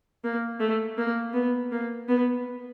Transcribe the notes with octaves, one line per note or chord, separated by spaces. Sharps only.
A#3
A3
A#3
B3
A#3
B3